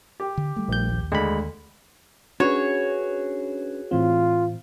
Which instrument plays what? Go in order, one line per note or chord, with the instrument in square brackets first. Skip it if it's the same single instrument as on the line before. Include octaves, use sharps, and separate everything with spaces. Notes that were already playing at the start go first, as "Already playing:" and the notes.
[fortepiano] G4
[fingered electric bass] D3
G3 A3
[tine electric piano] A#1 G6
[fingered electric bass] D#2
[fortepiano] D2 [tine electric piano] G#3 B5
[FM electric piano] C#4 D4 B4 [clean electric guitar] F#4 G#4 [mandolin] C#5
[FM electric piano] A2 E3 C4 [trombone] F4